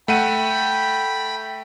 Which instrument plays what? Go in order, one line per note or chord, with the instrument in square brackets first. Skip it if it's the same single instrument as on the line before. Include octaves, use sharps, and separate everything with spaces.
[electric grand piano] A3 F#5 D#7 [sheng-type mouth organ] G5 B5